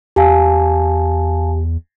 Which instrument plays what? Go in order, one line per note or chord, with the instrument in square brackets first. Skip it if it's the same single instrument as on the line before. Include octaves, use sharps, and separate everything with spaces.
[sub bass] E2 [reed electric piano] G4 [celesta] F5 G#5 A5